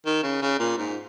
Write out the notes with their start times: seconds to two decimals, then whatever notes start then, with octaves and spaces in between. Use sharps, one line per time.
0.05 D#3
0.23 C#3
0.42 C#3
0.59 A#2
0.77 G#2